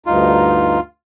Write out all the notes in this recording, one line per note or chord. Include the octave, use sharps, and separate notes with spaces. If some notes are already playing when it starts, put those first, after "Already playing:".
D2 G2 D#4 F4